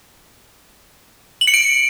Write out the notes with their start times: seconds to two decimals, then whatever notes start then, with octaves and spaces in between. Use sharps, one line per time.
1.41 F#7
1.47 C#7
1.54 D7